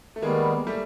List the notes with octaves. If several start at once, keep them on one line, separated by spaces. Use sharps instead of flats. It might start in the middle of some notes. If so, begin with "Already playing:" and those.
A3
D#3 G3 G#3 A#3 B3
G3 A3